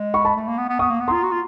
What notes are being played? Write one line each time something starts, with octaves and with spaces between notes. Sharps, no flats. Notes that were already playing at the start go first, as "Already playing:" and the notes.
Already playing: G#3
B5 C#6
A5 B5
A3
A#3
B3
B3
B3 C#6 D#6
A#3
B3
F4 A#5 C6
F#4
F4